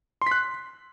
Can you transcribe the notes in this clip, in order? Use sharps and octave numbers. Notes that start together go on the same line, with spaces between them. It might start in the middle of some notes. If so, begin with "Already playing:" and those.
C6 F#6 B6